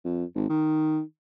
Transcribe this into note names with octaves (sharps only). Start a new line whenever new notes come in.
F2
G#1
D#3